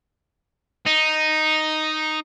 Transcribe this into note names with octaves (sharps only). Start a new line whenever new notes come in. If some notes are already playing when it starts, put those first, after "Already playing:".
D#4